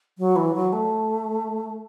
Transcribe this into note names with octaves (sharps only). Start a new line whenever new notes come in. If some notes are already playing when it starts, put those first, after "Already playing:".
F#3
E3
F#3
A3